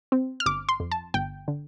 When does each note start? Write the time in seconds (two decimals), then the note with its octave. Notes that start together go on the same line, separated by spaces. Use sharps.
0.12 C4
0.40 F6
0.46 G1 D6
0.69 C6
0.80 F2
0.91 A5
1.14 G1 G5
1.48 D3